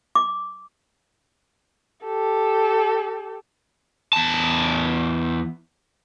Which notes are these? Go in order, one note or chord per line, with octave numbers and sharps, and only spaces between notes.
D6
G4 A4
E2 A5